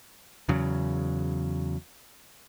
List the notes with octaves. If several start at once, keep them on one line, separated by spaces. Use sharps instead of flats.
E2 C#3 F#3